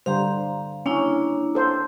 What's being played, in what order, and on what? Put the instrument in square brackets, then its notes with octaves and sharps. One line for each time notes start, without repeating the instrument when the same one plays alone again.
[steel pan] D3 G3 C5 [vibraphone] F5 A#5
[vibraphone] A#3 D4 E4 [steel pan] C#4
[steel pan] A4 C5